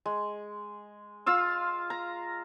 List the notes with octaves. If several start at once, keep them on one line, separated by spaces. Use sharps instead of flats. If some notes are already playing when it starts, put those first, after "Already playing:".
G#3
F4 F5 E6
A#5